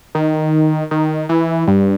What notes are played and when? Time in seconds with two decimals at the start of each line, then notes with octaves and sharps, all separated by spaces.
0.15 D#3
0.91 D#3
1.29 E3
1.67 G2